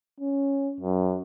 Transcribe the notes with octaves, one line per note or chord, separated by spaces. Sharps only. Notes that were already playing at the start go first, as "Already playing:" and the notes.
C#4
F#2